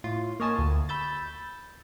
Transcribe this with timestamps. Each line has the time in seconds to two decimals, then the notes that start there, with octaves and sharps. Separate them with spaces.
0.04 A2 F4
0.40 A#3 C#5 D#5 G#5 A5
0.59 D2
0.89 B5 E6 G6 A6